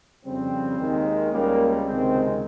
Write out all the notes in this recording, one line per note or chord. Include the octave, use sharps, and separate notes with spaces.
F2 C#3 G3 C4
D#2 D#3 G#3
C#2 C#3 G3 A#3
C#2 C3 D#3 G#3 C4